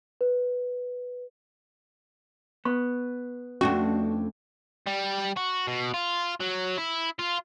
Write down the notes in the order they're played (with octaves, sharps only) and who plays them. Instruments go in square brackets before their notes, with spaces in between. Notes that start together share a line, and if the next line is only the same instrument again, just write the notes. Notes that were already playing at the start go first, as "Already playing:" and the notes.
[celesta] B4
[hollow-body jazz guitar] B3 [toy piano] C#6
[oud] F2 A3 D4 [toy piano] C#4 [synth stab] F#4
[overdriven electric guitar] G3
F#4
B2
F4
F#3
E4
F4